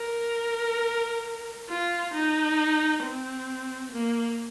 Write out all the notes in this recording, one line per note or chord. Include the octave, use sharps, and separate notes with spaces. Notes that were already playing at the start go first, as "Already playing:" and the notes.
Already playing: A#4
F4
D#4
C4
A#3